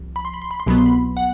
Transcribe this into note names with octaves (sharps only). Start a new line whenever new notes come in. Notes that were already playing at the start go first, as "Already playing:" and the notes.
Already playing: C2 F3
B5
C6
B5
C6
B5
C6
C2 B2 F#3 B3 B5
C6
B5
F#5